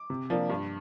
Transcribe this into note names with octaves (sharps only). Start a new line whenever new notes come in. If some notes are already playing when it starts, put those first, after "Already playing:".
Already playing: D6
C3
F3 A#3 D4
G2